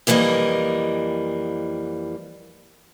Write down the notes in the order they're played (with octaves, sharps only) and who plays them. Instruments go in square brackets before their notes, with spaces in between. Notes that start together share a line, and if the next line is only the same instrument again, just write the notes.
[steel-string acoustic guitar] F2 E3 G3 A#3 D#5